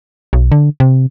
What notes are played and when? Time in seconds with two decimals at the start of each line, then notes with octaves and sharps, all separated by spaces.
0.33 B1
0.52 D3
0.80 C3